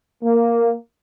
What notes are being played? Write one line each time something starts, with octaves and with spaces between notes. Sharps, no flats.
A#3